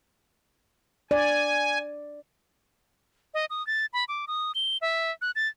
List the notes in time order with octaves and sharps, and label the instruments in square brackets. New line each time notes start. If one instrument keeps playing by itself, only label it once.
[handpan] D5 [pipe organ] G#5
[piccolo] D#5
D#6
A6
B5
D6
D#6
G7
E5
F#6
A6